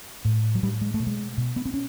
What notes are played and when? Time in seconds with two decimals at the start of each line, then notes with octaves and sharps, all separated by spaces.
0.25 A2
0.55 F#3
0.63 A2 G3
0.81 G#3
0.94 A3
1.00 B2
1.07 G#3
1.38 B2
1.56 B3
1.65 C4
1.74 C#4